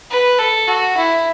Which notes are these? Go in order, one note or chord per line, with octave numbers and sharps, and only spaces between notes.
B4
A4
F#4
E4